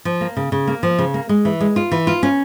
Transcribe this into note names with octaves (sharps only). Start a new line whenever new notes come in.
F3
A#3
C#3
C#3
A#3
F3
C#3
A#3
G#3
E3
G#3
F4
E3
F4
C#4